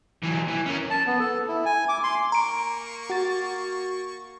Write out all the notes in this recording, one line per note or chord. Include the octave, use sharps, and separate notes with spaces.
E3 F#3
E3
C#4 A#4
A5
B3
A4
E4
G#5
D6
C6
A#3 A#5 C#6 D7
F#4 A6